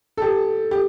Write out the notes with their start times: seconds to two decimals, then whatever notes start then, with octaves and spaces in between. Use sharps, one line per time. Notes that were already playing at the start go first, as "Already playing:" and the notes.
0.17 A4
0.22 G4
0.71 G4